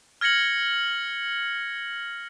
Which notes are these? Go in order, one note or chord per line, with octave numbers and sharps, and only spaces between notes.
F6 G#6 A#6 C#7 F#7